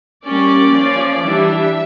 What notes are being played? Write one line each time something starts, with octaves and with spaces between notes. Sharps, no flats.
G3 A#3 C#4 D5
F3 C#4
E3 G3 D4 E5